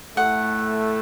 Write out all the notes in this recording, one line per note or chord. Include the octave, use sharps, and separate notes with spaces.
A2 A3 F#5